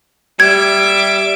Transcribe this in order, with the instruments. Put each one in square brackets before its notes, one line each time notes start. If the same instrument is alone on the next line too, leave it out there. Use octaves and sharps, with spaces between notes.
[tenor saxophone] G3 [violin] E5 D6 [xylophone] G#6